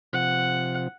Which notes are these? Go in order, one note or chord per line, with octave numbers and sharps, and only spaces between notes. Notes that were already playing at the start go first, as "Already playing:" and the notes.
C3 F3 F#5